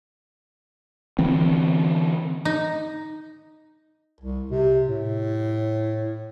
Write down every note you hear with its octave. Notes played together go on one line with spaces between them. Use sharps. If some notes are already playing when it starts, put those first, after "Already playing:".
D3 E3 C4
D#4
C2
C3
A2